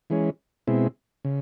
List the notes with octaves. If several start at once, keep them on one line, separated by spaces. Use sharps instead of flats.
E3 G#3 C#4
B2 G#3 C4 E4
C#3